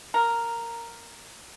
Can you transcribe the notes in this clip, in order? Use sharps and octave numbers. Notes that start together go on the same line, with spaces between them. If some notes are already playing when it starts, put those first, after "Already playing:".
A#4